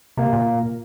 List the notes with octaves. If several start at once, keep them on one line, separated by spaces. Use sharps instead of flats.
C3 A#3
A#2